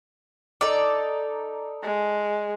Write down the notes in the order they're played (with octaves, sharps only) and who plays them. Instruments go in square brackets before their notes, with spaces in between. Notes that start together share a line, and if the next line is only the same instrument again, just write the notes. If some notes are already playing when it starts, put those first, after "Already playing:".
[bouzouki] D#4 A4 [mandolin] D5
[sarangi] G#3